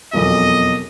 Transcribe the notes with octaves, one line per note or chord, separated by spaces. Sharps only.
E1 B1 F2 D#5